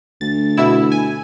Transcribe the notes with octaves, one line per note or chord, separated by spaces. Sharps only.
D2 A6
B2 E4 E6
G#5